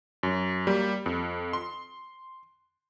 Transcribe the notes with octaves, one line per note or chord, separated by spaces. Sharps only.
F#2
G3 A#3
F2
C6